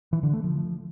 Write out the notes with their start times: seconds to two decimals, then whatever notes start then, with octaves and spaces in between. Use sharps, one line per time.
0.13 E3
0.23 D3
0.33 A3
0.44 F3